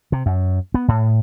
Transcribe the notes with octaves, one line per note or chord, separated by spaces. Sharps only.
C3
F#2
B3
A2